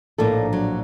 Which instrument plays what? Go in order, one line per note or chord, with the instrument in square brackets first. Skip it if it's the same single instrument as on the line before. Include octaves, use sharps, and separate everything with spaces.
[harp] A#1 D4 A#5 [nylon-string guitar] A2 A#3 A4
[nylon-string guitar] F#3